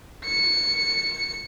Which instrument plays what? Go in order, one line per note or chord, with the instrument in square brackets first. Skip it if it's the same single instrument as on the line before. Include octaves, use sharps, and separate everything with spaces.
[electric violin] C#7